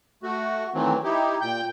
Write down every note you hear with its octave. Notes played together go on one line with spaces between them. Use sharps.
A3 F#4
D#3 E3 F#3 A3 C4
D#4 E4 G4
A#2 G5 G6